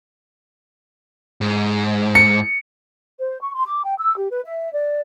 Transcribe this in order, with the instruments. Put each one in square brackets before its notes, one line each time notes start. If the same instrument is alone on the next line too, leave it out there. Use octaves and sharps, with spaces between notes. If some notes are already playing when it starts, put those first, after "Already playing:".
[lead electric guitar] G#2
[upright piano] C#7
[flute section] C5
C#6
C6
D6
G5
E6
G4
B4
E5
D5